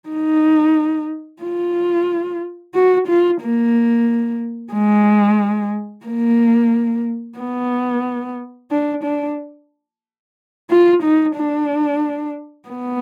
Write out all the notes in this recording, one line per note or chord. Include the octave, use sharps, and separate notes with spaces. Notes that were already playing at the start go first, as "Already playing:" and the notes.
D#4
F4
F#4
F4
A#3
G#3
A#3
B3
D4
D4
F4
D#4
D4
B3